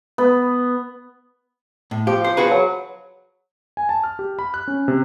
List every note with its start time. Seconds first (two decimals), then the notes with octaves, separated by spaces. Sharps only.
0.18 B3
1.91 A2
2.07 F3 G4
2.24 C5
2.37 F#4 G#4 B4
2.51 F#3
3.77 G#5
3.89 A5
4.04 F6
4.19 G4
4.39 B5
4.54 F#6
4.68 C#4
4.88 C3